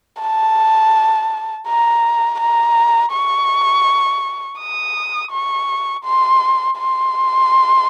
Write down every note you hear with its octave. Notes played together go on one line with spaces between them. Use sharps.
A5
A#5
A#5
C#6
D#6
C#6
C6
C6